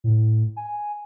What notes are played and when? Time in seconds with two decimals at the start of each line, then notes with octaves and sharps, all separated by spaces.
0.04 A2
0.56 G#5